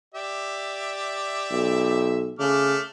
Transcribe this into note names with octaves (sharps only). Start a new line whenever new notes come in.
G4 D5 E5
B1
C#3 A3 D6 F6